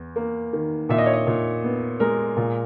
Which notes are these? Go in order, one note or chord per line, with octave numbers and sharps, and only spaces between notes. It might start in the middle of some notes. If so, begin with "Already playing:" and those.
Already playing: E2
A#3
D#3
A#2 E5
D#5
C#5
D#5
A#2
B3
G#3 A#4
A#2